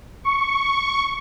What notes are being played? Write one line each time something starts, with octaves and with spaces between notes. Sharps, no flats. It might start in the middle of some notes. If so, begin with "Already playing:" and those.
C#6